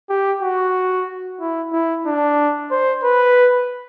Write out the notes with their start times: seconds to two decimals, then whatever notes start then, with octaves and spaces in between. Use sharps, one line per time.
0.10 G4
0.42 F#4
1.40 E4
1.73 E4
2.06 D4
2.71 C5
3.03 B4